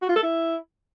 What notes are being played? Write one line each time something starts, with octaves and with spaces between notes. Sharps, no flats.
F#4
F4
A4
E4